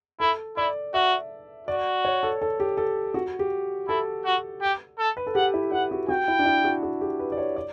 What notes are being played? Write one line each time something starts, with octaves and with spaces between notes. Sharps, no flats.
E4 A4
E4 D5
F#4 E5
F#4 D5
C#5
A4
A4
G4
A4
F#4
G4
E4 A4
F#4
G4
A4
B4
A4
G4 F#5
E4
E4 F#5
F#4
F#4 G5
E4
D4
E4
F#4
F#4
G4
B4
D5
C#5
D5